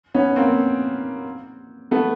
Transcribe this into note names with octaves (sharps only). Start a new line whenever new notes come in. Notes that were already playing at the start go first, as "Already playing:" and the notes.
B3 C#4
A#3 C4
A3 B3